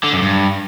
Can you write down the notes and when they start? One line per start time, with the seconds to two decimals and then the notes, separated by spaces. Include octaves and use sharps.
0.04 D3
0.13 F#2
0.22 G2